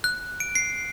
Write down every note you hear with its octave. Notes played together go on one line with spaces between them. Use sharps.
F#6
D7
C7